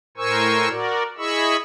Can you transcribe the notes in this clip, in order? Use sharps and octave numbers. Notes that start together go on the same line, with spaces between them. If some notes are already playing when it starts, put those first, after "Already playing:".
A2 A#4 C5 G#5 C#6 E6
F#4 A#4 D5
E4 G#4 D#5 B5 C#6 E6